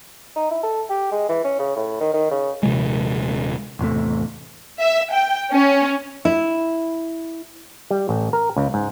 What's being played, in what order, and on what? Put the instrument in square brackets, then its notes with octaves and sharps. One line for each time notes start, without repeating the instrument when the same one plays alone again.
[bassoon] D#4
E4
A4
G4
G#3
E3
C#4
C#3
A2
D#3
D#3
C#3
[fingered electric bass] D#1 C3 F3 G#3
[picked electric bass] A1 E2 C3 A3
[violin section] E5
G5
C#4
[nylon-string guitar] E4
[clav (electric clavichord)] G3
A1
A#4
C#2
G#2